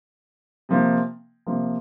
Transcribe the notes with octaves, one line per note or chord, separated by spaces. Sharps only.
C3 F3 A#3
C3 F3 A#3